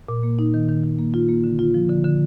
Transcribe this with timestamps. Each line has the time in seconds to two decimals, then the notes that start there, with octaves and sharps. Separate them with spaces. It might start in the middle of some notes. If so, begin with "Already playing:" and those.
0.09 A#2
0.23 A#3
0.39 D#4
0.54 D#3
0.69 D#3
0.83 D#3
0.99 A#3
1.14 F4
1.29 A#3
1.44 D3
1.59 F4
1.74 F3
1.89 D3
2.04 D3